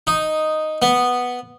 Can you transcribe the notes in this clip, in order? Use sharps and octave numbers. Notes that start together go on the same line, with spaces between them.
D#4
B3